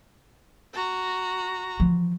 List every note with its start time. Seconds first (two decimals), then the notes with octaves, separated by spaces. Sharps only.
0.74 F#4 A#5
1.80 E3 F3